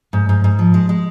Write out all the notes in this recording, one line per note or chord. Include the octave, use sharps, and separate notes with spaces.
G#2
G#2
G#2
F3
G#3
G#3